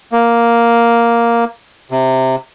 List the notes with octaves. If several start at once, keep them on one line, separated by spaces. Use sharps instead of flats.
A#3
C3